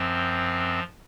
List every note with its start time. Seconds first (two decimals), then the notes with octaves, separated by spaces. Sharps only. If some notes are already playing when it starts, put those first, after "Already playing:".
Already playing: F#2 F3 C4